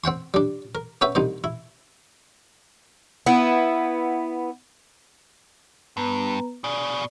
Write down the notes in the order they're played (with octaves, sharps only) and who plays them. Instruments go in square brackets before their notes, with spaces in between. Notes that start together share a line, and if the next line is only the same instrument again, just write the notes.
[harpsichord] C4 F#5 G5 C6
G3 D4
A#4
B3 C#4 B4 E5 G5
C2 D#4 C5
E4
[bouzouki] B3 E4
[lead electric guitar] G2 [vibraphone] B3 B4 A#5
[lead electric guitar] B2 G#4 [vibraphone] D5